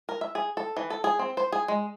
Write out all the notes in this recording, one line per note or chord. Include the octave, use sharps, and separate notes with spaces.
A#4
E5
G#4
A4
E3
A4
G#4
C4
C5
G#4
G#3